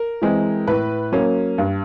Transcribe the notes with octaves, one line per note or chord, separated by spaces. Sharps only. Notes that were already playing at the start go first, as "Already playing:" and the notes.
Already playing: A#4
E3 G#3 C4
A2 B4
F#3 A#3 C#4
G2